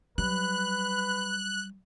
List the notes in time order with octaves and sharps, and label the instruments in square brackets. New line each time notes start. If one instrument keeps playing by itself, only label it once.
[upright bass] F#3 G3 [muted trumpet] B4 [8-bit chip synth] F#6